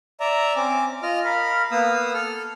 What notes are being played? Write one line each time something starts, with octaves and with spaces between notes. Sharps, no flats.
D5 E5 A#5
C4 C#4 D6
F4 D#5 F6
A#4 F5 B5
A#3 B3 F5 D#6 E6
A4 F6